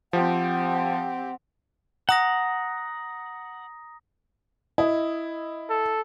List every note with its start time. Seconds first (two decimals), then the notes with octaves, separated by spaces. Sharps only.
0.13 F3 C4 G4 F#5
2.09 F#5 A#5 D#6 A#6
4.78 E4 D#5
5.70 A4